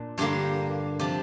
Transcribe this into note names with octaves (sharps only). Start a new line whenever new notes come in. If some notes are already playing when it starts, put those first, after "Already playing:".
Already playing: A#2 D4
G2 D3 A#3 G4
C3 F3 D4 G4